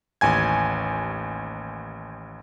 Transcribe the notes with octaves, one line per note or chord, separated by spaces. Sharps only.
A1 D#2 G#5 G#6